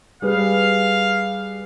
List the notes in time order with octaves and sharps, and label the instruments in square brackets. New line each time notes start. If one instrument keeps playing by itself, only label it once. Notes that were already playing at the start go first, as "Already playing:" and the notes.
[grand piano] G3 G#4 B4 [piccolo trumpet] F5